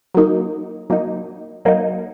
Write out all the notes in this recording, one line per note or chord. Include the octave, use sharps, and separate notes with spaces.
F#3 A#3 D#4
F#3 A#3 D#4
F#3 A#3 D#4